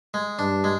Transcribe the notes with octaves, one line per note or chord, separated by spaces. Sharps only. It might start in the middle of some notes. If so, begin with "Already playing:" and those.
G#3
G2 D4
G#3